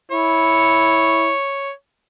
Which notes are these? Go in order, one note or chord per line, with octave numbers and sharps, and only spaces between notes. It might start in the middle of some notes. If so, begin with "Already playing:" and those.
E4 C#5